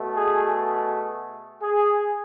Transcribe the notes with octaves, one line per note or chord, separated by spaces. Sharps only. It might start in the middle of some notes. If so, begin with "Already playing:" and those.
Already playing: B2 A3
G#4
G#4